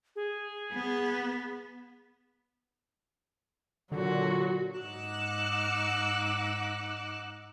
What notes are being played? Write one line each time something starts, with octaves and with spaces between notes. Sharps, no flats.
G#4
B3
A#2 D3 F#3 F#4
G#2 D#4 F#5 D6 E6 F#6